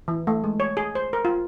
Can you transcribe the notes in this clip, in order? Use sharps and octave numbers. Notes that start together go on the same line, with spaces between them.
E3
A3
G#3
C#5
G#4
C5
A#4
F4